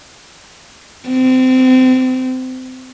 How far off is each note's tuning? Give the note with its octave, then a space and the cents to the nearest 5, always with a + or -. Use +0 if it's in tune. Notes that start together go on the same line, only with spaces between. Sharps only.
C4 -25